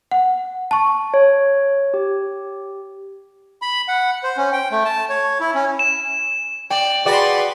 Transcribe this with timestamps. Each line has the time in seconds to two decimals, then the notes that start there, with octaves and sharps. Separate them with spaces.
0.11 F#5
0.71 A5 C#6
1.14 C#5
1.94 G4
3.62 B5
3.88 F#5
4.23 C5
4.37 C#4
4.53 G5
4.71 A3
4.85 A5
5.09 C#5
5.40 E4
5.54 C#4
5.79 E7
6.70 D5 G5
7.06 F#4 G#4 B4 D5 G5 B5 C6